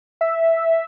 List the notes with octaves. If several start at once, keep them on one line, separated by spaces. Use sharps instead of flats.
E5